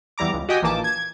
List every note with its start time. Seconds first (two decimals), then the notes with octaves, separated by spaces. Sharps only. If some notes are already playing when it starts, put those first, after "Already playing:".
0.18 E2 E3 G3 A#5 D6
0.34 C#2
0.49 F#4 G4 D#5 G5 G#5 D#6
0.62 A#1 A#2 E3 A#3 A5 D6
0.84 G#6